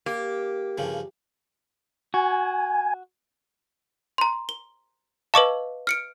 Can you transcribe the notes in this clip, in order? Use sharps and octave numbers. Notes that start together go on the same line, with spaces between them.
A#3 G4
G2 C#3 F3
F#4 G#5
A#5 C6
G7
B4 D#5 F5 A5 C#6 D6
F6 C#7 D7